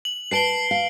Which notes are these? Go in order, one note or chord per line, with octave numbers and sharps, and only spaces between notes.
F#7
B4 A5 C7 D7 G7
F5